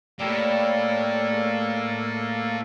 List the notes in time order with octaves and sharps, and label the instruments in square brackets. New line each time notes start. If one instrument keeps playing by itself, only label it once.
[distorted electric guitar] A2 [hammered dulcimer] G3 G4 C#5 [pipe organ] A#3 A4
[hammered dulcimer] G#4 A#4